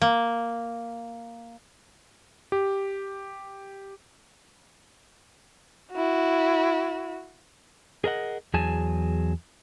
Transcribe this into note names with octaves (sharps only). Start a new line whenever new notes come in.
A#3
G4
E4 F#4
G#4 A#4 D#5 F#5
E2 F#3 G#4 G#5 A5